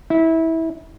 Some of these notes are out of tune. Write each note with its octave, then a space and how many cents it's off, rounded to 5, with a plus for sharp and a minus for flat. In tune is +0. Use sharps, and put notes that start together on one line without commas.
E4 -20